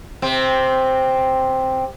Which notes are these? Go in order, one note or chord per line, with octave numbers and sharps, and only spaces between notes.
C3 C4